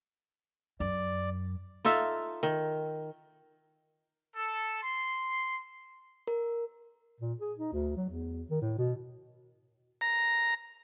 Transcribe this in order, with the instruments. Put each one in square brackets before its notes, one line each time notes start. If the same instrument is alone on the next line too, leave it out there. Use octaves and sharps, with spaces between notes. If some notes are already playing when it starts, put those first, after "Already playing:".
[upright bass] F#2 [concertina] D5
[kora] D#4 F4 A4 E5
D#3
[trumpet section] A4
C6
[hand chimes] A#4
[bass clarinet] A#2
G#4
D#4
D2
F#3
E2
D#3
A2
B2
[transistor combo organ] A#5